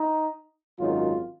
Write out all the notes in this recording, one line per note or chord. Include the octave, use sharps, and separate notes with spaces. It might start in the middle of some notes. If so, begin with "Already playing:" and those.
Already playing: D#4
G#1 F#2 D#3 F#3 F4